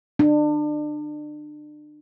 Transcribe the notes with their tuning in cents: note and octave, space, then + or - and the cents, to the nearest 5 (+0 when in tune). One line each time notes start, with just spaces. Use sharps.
D4 +30